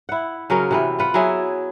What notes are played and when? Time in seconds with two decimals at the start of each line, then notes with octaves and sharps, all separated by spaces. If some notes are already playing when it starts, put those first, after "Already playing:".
0.09 E4 F#5
0.50 C#3 F#3 C#4 A#4
0.71 C3 E3 B3
0.99 F4 B4 F#5
1.14 F#3 E4 G#4 E5